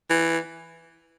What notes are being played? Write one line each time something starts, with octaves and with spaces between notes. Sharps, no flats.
E3